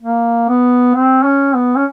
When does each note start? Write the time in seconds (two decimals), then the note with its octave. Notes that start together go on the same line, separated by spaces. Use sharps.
0.03 A#3
0.49 B3
0.95 C4
1.25 C#4
1.55 B3
1.77 C#4